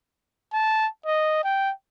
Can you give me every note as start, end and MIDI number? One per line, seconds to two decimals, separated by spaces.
0.53 0.88 81
1.06 1.39 75
1.44 1.71 79